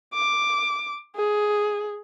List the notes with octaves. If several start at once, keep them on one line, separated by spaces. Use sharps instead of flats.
D6
G#4